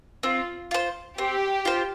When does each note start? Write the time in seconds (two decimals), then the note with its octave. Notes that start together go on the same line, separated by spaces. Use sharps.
0.23 C4 F4
0.71 F4 C5
1.18 C4 G4
1.65 F4 C5